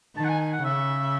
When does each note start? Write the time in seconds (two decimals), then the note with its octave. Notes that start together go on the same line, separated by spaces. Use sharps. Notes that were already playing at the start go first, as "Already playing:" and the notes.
0.17 D#3 A5
0.24 F#5
0.29 G#5
0.40 G#5
0.53 F#5
0.64 C#3 E5